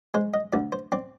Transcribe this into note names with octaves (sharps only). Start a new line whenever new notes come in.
G#3 C5
D#5
D2 D5
C5
C4 D5